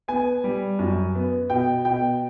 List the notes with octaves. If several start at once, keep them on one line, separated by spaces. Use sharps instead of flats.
B3 G#5
G3
F#2
B3
B2 G5
B2 G5